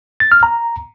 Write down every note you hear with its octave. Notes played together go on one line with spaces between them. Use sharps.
A6
F6
A#5